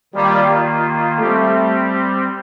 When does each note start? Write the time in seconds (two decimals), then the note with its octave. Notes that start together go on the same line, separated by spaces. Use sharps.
0.14 D#3 G3 A#3 F4
1.19 G3 A3 C4 G4